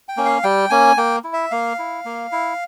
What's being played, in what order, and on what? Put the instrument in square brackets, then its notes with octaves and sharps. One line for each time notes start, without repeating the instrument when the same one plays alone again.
[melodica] G5
A#3 C#4
F5
G3 G5
A#3 C#4 G#5
A#3 G5
E4
E5
A#3 F5
E4
A#3
E4